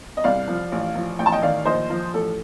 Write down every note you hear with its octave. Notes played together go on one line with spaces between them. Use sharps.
D#5
C2 D5 F5
F3
A1
F3
A1 G5
A5
D#5 G5
D#3 D5 F5
A#1 C5 D#5
F3
A1 A4